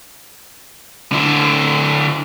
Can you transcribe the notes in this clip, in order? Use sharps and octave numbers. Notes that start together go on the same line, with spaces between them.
D3 E4